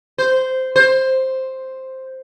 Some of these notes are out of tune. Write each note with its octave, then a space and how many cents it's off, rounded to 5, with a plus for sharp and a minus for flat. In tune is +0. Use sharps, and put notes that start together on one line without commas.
C5 -10
C5 +5